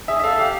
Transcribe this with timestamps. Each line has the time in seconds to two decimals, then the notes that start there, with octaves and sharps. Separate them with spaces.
0.08 G#4 E5
0.19 E5
0.23 A4 F5
0.39 G4 F5